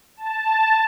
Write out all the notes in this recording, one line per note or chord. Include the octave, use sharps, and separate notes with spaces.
A5